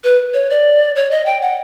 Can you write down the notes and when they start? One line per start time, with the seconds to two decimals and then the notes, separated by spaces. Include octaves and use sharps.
0.04 B4
0.34 C#5
0.50 D5
0.96 C#5
1.11 D#5
1.26 G5
1.41 F#5